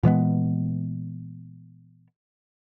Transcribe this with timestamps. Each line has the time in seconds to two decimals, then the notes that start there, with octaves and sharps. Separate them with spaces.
0.03 A#2 E3 G#3 B3